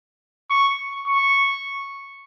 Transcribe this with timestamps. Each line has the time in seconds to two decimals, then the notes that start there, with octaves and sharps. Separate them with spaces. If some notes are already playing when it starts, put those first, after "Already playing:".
0.50 C#6
1.07 C#6